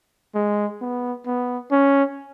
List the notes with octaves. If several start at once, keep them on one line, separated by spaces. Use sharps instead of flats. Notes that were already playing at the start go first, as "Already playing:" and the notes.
G#3
B3
B3
C#4